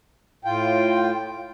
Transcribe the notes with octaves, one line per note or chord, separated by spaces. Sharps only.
A2 F4 G5